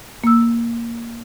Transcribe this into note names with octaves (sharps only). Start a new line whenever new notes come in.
A#3 E6